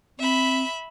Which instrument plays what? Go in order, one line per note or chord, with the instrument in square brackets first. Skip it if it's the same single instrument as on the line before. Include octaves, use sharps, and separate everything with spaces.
[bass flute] C4 [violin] E5 B5